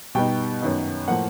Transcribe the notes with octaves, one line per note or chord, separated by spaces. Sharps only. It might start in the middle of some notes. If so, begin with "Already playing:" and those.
B2 G3 B3 D#4 G5
F#2 D#3 F#3 B3 D#4
A2 F3 A#3 F#5